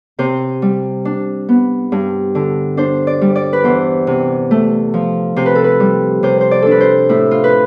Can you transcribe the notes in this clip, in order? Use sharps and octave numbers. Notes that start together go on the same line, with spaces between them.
C3 C5
G3
D4
B3
G2
D3
D4 C5
D5
G3
D5
B4
E2 C5
C3
A3
F3
C3 C5
B4
A4
B4
G3
C3 C5
C5
D5
D4 A4
B4
C5
A2 E4
F4
B4